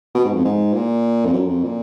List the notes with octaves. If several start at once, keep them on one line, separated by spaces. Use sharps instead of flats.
B2
G#2
F2
G#2
A#2
F2
F#2
F2
A#2